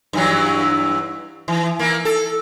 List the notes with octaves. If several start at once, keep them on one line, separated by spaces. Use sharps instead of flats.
G2 E3 F#3
E3
E3 A#3
A4